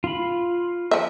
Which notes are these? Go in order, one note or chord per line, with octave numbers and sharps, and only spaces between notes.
F4 B5
F3 E5